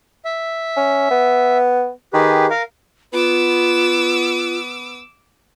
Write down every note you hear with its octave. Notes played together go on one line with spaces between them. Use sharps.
E5
C#4
B3
D#3 G4 G#4 B4
A#4 F5
B3 F4 D6 E6